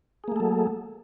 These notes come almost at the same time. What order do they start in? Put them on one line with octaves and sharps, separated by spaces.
G#4 A#3 A3 A4 F#3